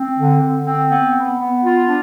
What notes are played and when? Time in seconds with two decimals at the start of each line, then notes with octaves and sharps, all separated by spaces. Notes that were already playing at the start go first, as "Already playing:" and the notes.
Already playing: C4
0.15 D3
0.40 D3
0.65 C4
0.89 B3
1.13 B3
1.38 B3
1.62 F4
1.87 D4